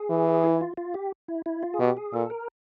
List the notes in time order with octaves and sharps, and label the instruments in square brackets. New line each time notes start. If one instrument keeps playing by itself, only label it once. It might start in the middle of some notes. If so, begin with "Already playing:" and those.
Already playing: [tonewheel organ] G#4
[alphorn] E3
[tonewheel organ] E4
F4
F4
G4
E4
E4
F4
G#4
[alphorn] B2 [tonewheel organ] G4
[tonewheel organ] G#4
[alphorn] A#2 [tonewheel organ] A4
[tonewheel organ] A#4